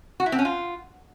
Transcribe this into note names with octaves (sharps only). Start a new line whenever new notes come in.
F#4
E4
C4
C#4
F4